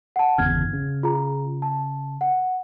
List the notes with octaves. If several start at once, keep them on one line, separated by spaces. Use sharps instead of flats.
F#5 A5
G1 E2 C#3 F6 G#6
C#3
F4 G#4 A#5
A5
F#5